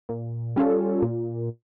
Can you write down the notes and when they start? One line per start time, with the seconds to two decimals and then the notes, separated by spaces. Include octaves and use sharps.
0.09 A#2
0.56 G3 C#4 F4 A4
1.02 A#2